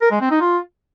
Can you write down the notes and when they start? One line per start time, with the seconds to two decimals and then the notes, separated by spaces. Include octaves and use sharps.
0.01 A#4
0.11 G#3
0.21 C4
0.31 D#4
0.41 F4